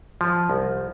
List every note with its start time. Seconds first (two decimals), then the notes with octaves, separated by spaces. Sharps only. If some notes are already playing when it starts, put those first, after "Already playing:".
0.21 F3
0.50 C2